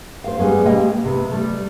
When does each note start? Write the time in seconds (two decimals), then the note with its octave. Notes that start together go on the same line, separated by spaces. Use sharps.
0.24 C5 F5
0.39 G3 G#3 B3 C#4
0.65 B2 G#3 A#3 D#5 F5 G5
0.78 G4
1.05 C3 B3
1.31 G3 A3